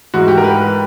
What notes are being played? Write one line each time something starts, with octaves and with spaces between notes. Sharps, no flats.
G#2 E3 G#3 F#4
G4
A#4
B4